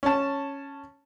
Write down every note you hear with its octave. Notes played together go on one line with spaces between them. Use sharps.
C#4 A5